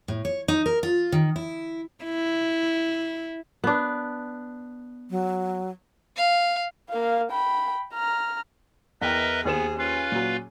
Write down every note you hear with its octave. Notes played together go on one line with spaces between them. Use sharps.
A2
C#5
D#4
A#4
F4
D#3
E4
E4
B3 D4
F#3
F5
A#3 F5
G5 B5
A#5 F6
E2 A#4 B4 D#5 E5 G5
D#2 B3 G#4 C5 E7
C#4 F4 B4 F5
A#2 F#3